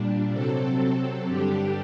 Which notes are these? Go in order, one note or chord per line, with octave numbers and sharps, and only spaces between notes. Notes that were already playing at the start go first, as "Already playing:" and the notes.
Already playing: A#2 G3 D4
C3 F#3 C4 A4
A4
G2 D3 G3 D4 G4